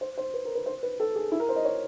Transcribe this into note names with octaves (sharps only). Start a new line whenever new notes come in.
C5
C5
B4
A#4
B4
C5
B4
A4
G#4
E4
A#4
C5
D#5
C#5